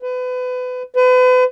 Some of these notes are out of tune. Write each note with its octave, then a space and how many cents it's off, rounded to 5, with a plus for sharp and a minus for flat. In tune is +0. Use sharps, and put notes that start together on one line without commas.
B4 +30
B4 +40